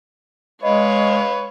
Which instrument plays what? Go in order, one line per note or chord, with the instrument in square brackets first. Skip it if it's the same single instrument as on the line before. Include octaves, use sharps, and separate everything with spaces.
[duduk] G#3 [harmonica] B4 F5 [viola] C#5 [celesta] D#5